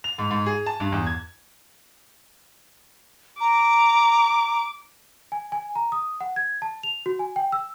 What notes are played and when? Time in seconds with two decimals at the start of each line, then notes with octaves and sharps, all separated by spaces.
0.04 F7
0.18 G#2
0.31 G#2
0.46 G#4
0.66 A5
0.80 G2
0.92 E2
1.07 G#6
3.40 A#5 D6
5.32 G#5
5.52 G#5
5.76 A#5
5.92 D#6
6.21 F#5
6.36 G#6
6.62 A5
6.83 F7
7.06 F#4
7.19 G#5
7.36 G5
7.52 E6